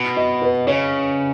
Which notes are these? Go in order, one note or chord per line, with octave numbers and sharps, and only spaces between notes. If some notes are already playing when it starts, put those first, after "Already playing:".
Already playing: B2
D#5
B4
C#3 C#5